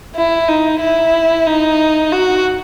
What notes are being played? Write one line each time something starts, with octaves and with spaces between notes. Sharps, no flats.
E4
D#4
E4
D#4
F#4